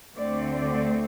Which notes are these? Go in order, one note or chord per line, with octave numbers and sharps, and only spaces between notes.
D2 D3 A3 C4 D5
D5